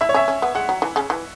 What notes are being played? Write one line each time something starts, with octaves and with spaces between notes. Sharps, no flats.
E4 E5
C#5
C#4 E5
C#4
B3
G#3 F#5
F#3
E3
C#3
E3